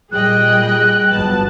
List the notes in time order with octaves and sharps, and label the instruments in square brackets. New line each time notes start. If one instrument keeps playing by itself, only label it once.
[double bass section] A#2 G3 [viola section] G#4 D#5 G5 [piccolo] F#6
[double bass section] G1 F#3 B3 [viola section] A5